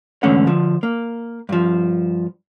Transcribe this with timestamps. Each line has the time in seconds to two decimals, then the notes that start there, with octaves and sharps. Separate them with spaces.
0.23 E2 G#2 D3 A3 C#4 F#5
0.47 D3 F3
0.83 A#3
1.49 G2 F3